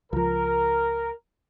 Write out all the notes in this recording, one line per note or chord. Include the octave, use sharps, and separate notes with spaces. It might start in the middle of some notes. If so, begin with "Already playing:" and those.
C#2 F3 A#4